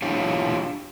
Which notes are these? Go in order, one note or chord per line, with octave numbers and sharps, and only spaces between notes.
D4 E4 F4 G4 C#5